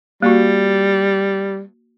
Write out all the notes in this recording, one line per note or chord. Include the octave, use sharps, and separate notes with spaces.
G3 A#3 F#4